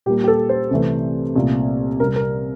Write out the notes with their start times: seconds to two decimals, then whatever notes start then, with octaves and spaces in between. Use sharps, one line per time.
0.06 A#2 G3 A#3 G4
0.24 G4
0.28 A4
0.49 C5
0.71 C2 C3 E3 A3
1.36 C2 A#2 A3
2.00 C2 C3 G3 A#4
2.16 A#4